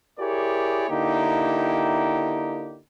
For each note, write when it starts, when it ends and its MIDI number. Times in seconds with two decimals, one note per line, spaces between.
0.19 0.86 64
0.19 0.86 67
0.19 0.86 68
0.19 0.86 70
0.19 0.86 73
0.19 0.86 74
0.89 2.79 50
0.89 2.79 58
0.89 2.79 63
0.89 2.79 64
0.89 2.79 67